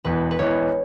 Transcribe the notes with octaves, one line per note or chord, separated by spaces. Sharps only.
E1 E2 E3 B4
B4
E1 E2 E3 C#5